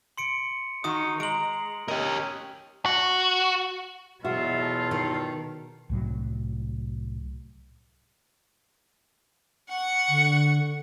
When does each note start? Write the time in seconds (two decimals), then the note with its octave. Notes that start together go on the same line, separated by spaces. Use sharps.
0.18 C6 C#7 D7
0.84 D#3 D#4 F#4 D#6
1.20 G#3 A#5 D7 F#7
1.88 C#4 G4 A#4 D#5
2.86 F#4
4.24 E2 B2 F#3 F4 F#4 E5
4.62 A4
4.91 D#3
5.90 C2 A2 F#3
9.69 F#5 C#6
10.09 D3